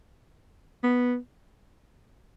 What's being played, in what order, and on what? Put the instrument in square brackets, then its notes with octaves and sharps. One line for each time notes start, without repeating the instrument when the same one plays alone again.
[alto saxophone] B3